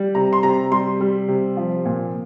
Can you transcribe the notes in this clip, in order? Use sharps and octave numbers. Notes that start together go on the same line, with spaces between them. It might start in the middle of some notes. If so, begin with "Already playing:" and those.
Already playing: G3
C3 A#5
C6
C3 A#5
G3 C6
G3
C3
F3
A#2